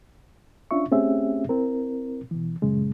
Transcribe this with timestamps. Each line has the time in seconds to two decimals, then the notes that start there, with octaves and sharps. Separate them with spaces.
0.71 C#4 D4 F4 E5 C#6
0.91 A3 C4 C#4 G4 G#4 E5
1.49 C4 E4 A#4
2.31 B2 E3
2.62 F#2 A#2 C#3 G#3